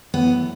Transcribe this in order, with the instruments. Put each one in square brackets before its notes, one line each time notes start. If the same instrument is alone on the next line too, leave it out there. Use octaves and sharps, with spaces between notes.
[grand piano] F#2 E3 A3 [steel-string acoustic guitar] B3